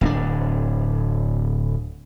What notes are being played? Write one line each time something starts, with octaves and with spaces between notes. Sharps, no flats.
D1 C4 D4